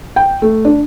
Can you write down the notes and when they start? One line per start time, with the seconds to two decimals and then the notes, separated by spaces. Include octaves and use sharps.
0.16 G5
0.42 A3
0.65 D4